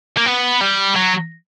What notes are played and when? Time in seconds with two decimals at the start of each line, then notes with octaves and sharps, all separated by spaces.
0.17 A#3
0.26 B3
0.61 G3
0.96 F#3